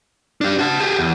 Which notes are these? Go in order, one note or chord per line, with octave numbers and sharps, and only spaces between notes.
D4 G4
F#4 A5
G4 G#4
E2